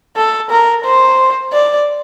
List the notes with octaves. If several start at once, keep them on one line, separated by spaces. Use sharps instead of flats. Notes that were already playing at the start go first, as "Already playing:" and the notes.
A4
A#4
C5
D5